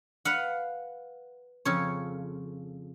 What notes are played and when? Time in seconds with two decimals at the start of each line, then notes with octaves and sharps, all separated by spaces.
0.25 B4 F5 F#5
1.65 F2 C#3 C#5